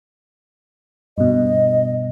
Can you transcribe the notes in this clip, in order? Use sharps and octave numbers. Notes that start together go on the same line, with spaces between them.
G2 B2 D#5